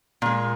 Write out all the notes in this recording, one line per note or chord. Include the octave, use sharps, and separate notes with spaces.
A#2 G#3